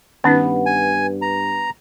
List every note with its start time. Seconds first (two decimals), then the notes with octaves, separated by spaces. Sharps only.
0.24 G2 D#3 B3 C#4 D#4
0.66 G#5
1.22 A#5